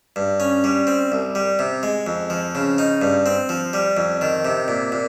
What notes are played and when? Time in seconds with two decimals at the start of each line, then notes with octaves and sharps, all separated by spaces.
0.16 G2
0.40 C#4
0.64 G3
0.87 C4
1.12 C2
1.35 G3
1.59 C3
1.83 G#3
2.07 F2
2.30 F3
2.55 C#3
2.78 D#4
3.02 G2
3.26 C4
3.49 F3
3.73 G3
3.97 F2
4.21 D#3
4.45 C3
4.68 A#2
4.92 A#2